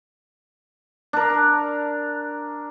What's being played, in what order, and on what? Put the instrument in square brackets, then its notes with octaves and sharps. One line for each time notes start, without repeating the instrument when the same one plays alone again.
[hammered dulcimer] D4 A#4